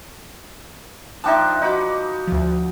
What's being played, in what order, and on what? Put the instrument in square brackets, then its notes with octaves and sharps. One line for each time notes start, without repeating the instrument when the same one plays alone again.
[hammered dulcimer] F3 D4 D#4 [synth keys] E5 G5 A5
[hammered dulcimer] D#4 F#4 [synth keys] D#5 B5 D6
[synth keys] D2 F3